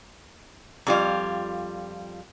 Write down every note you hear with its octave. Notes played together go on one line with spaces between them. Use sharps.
F2 G3 F4